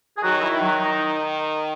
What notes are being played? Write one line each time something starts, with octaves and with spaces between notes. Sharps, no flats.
G#4
D#3 F#3 F#4
E4
D#3
F#3 F#4
D#4